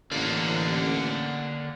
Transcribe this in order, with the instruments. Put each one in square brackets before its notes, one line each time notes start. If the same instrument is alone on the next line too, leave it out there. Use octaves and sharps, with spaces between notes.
[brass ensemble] A1 [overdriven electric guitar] D3 A#3 [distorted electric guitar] D5 F#5